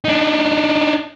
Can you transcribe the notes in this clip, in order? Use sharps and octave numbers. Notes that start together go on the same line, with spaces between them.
D4 D#4